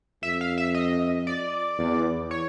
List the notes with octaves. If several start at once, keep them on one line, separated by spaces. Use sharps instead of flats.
F2 E5
F5
E5
D#5
D5
E2
C#5